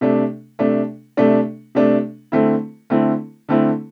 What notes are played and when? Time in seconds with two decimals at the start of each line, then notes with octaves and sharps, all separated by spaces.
0.01 C3 A3 D4
0.59 C3 A3 D4
1.17 C3 A3 D4
1.75 C3 A3 D4
2.32 D3 A3 C4 E4
2.90 D3 A3 C4 E4
3.49 D3 A3 C4 E4